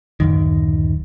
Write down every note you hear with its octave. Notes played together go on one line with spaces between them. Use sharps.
D1 F#2 D#3